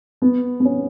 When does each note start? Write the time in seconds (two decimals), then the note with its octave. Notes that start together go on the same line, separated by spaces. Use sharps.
0.22 B3
0.60 B3
0.65 C#4